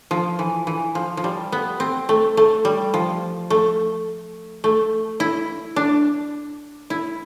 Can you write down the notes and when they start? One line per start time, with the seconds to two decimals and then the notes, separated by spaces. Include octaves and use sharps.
0.11 F3
0.39 E3
0.67 E3
0.95 F3
1.17 F3
1.24 G3
1.52 B3
1.80 C4
2.09 A3
2.37 A3
2.65 G3
2.94 F3
3.50 A3
4.64 A3
5.20 E4
5.76 D4
6.90 E4